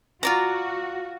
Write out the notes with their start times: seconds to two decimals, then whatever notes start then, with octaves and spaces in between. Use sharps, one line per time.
0.23 F4 F#4 D5 A#5